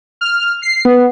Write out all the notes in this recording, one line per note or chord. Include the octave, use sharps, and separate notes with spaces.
F6
C7
B3